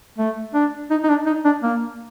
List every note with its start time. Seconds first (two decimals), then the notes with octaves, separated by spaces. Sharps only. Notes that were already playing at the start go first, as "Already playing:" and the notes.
0.19 A3
0.54 D4
0.91 D#4
1.04 D#4
1.09 D4
1.26 D#4
1.45 D4
1.63 A#3